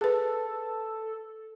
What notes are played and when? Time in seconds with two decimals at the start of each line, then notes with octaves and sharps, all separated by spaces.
0.01 G#4 A4 B4